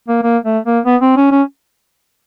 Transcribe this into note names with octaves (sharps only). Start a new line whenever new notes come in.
A#3
A#3
A3
A#3
B3
C4
C#4
C#4